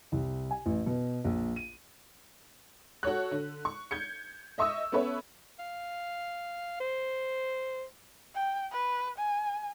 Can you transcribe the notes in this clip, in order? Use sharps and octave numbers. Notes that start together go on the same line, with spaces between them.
C2
G#5
A1
B2
A#1
D#7
F#4 A4 C#5 F#6
D3
C#6
G6 G#6 C#7
D#5 E5 C#6 D#6 E6
B3 C#4 A4 B4 C#5 E5
F5
C5
G5
B4
G#5